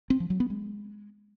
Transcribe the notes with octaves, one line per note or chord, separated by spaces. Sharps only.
C4
F3
F#3
B3
G#3